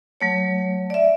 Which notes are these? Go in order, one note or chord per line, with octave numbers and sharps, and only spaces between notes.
F#3 A3 C#5
D5 E5